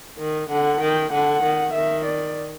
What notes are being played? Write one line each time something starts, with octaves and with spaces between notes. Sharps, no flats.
D#3
D3 F#5
D#3 G5
D3 F#5
D#3
D#3 E5
D5